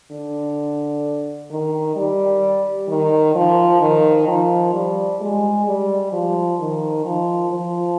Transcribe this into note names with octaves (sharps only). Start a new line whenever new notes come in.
D3
D#3
G3
D#3
F3
D#3
F3
G3
G#3
G3
F3
D#3
F3
F3